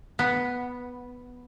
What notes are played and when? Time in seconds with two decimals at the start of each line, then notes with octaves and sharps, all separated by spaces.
0.19 B3